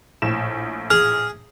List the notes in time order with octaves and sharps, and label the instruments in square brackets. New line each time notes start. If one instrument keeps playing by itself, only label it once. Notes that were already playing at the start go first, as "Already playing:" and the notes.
[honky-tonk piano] A#1 A2 E7
[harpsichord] G#4 [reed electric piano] F6